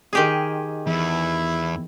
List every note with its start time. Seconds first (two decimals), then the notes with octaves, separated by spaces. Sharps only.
0.13 D#3 G4 G#4
0.87 E2 E4